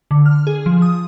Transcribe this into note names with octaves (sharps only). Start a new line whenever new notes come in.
D3
F6
G#4
F3
D#6